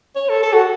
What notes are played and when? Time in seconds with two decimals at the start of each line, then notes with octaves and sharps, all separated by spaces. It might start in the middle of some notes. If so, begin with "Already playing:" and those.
0.16 C#5
0.29 A4
0.43 A4
0.53 F#4